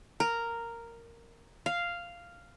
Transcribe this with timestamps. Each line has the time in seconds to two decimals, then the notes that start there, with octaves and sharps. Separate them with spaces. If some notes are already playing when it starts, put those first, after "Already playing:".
0.20 A#4
1.66 F5